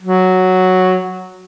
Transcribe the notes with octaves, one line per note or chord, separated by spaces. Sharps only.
F#3